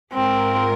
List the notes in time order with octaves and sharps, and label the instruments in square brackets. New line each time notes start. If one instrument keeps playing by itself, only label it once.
[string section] G#2 G#3 F4 A#4 [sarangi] C4